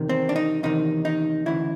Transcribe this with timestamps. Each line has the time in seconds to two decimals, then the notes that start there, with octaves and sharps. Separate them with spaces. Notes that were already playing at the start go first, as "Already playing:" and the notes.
Already playing: E2 C3 D#3
0.09 C4
0.29 D4
0.36 D#4
0.63 E2 C3 D#3 D#4
1.05 D#4
1.46 D2 C#3 E3 E4